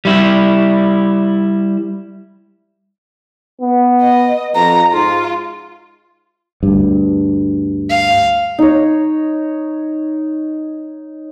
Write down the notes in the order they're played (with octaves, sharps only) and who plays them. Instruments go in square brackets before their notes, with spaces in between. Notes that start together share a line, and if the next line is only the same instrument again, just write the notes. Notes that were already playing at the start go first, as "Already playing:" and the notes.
[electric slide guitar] G3 E4
[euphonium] B3
[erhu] D#5
[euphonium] F2 [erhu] A#5
[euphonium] G#2 [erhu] F4
[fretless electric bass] D2 G2
[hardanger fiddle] F5
[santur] D#4 C#5